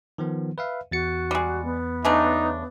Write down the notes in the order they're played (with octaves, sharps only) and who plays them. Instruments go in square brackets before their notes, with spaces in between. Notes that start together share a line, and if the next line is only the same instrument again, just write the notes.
[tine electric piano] D#3 F3 B3
B4 E5 F5
[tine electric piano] E2 A6 C#7 [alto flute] F#4
[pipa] G3 G#3
[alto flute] B3
[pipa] C#3 A3 D4 [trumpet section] D#4